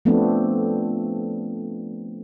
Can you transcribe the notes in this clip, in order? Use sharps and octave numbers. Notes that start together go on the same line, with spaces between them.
F3 A3 B3 C4 D4